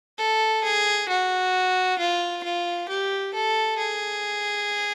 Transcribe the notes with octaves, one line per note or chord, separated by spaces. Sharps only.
A4
G#4
F#4
F4
F4
G4
A4
G#4